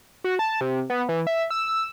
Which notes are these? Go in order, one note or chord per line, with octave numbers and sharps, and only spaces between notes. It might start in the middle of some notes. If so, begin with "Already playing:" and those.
F#4
A5
C3
B3
E3
E5
E6